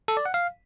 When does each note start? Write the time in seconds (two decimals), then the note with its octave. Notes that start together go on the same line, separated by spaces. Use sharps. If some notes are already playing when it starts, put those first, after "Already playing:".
0.08 A4
0.17 D5
0.25 F#5
0.34 F5